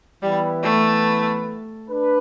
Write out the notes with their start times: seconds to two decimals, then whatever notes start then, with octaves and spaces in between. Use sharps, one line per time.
0.22 E3 G3 B3 E4 B4
0.64 A3
1.89 D4 B4